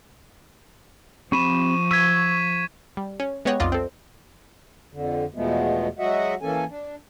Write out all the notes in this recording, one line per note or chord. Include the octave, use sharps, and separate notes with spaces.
F3 C4 G4 B5 C#6 D#7 E7
C#6 E6 G#6 B6 D#7
G3
C#4
G#3 B3 G4 C#5 D#5 F#5
B1 F2 F4 D5 D#5 A#6
C4 A4
F2 D3
E2 B2 F3 G#3 A3 B3
F#3 G#3 F#4 D#5 E5 F#5
E3 A#3 C#4 A4 G#5
D4